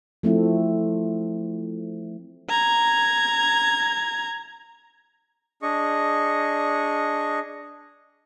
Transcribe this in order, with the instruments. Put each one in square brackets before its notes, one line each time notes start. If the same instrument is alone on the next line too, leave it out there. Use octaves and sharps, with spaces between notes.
[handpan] F3 A3 C4 E4
[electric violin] A#5 G#6
[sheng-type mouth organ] D4 G#4 D#5 C#6